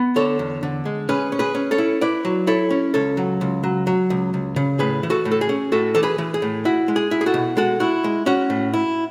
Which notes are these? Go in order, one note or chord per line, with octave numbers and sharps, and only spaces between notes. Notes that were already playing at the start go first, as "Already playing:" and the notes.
Already playing: B3
D3 A4 C#5
E2
D3
G#3
C#4 G#4 B4
C#4
G#4 B4
C#4
A4 C#5
E4
E4 B4 D5
F#3
E4 A4 C#5
C#4
C#2 A4 C#5
F#3
C#2
F#3
F#3
C#2
C#2
C#3
A2 G#4 B4
E3
F#4 A4
A2
A4
G#4
C#4
A2 F#4 A4
E3 A4
G#4 B4
E3
G#4
A2
E4 F#4
G#3
G#4
E4
G#4
F#4 A4
B2
G#3 F#4 A4
E4 F#4
G#3
C#4 F#4
A2
E4